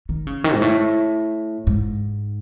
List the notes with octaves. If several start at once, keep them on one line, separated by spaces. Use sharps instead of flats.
D#3
C#3
D#3
G#2
A2
G#2